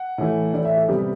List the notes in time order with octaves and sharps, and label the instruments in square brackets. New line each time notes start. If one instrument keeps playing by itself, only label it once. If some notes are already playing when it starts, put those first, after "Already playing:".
Already playing: [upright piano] F#5
A2 E3 A3
A2 E3 A3 D5
E5
A4
C3 G3 B3 G4